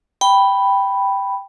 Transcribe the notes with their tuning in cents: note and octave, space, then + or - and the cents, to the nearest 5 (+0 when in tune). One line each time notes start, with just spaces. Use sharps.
G5 +0 B5 +0